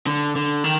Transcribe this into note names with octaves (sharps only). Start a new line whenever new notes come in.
D3
D3
D#3